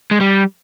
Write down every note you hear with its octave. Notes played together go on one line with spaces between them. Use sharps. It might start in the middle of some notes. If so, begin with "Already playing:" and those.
G#3
G3